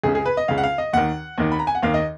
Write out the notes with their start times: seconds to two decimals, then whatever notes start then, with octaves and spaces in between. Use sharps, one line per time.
0.03 C#2 C#3 G#4
0.15 G#4
0.26 B4
0.37 D#5
0.48 C#2 C#3 F5
0.58 F#5
0.63 F5
0.78 D#5
0.93 D#2 D#3 F#5
1.38 D#2 D#3
1.52 B5
1.59 A#5
1.67 G#5
1.75 F#5
1.82 D#2 D#3 F5
1.94 D#5